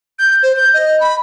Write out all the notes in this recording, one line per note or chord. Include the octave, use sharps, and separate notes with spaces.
G6
C5
G6
D#5
B5